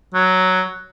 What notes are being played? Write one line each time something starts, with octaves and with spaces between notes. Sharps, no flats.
F#3